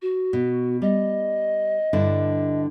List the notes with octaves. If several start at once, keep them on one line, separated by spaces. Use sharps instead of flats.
F#4
B2
G3 D#5
G2 D3 E4